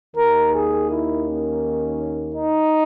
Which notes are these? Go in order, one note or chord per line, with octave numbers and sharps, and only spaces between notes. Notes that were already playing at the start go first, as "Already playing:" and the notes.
D#2 D#3 A#3 A#4
G#4
E4
C#4
D#4